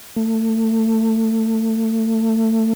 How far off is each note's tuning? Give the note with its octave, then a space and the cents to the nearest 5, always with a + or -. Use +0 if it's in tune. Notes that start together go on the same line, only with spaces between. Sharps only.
A3 +25